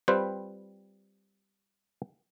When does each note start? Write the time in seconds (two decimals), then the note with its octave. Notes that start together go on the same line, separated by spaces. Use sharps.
0.08 G3 C4 F4 B4 C5